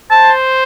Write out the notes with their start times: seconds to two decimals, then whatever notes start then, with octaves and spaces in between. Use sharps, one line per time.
0.11 C5 A5